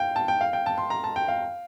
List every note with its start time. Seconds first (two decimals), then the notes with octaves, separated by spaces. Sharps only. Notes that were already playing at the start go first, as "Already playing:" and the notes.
Already playing: F5 G5
0.16 A5
0.28 G5
0.41 F5
0.53 G5
0.66 A5
0.78 C6
0.90 A#5
1.04 A5
1.16 G5
1.28 F5